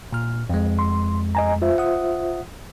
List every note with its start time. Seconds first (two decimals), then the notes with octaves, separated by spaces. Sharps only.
0.12 A#2 F6
0.50 F2 G#3
0.79 C6
1.35 D#5 G#5 A#5
1.62 F4 C5 E5
1.78 F#5 D#6